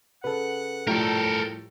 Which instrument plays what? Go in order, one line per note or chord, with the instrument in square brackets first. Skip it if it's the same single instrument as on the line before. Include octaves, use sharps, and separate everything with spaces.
[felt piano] C#3 [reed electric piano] A4 B4 [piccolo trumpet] F#5
[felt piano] A2 F3 G3 [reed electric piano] A3 [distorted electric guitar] A4 A#4 [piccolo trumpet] G5